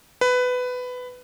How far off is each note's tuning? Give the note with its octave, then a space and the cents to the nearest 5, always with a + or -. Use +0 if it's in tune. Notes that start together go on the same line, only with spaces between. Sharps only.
B4 +15